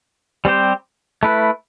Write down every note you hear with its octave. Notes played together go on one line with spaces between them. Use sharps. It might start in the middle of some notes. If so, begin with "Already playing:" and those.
G3 C4 G4 C5
A3 E4 B4